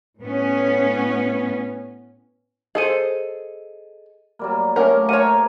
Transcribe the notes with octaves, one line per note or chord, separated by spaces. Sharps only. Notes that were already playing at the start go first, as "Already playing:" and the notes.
A2 B3 C#4
G#4 A4 C5 D#5 D#7
F#3 G3 A#3
A3 A#3 C#4 A#4 C#5 F#5
G4 A#4 C5 C#5 F#5 D#7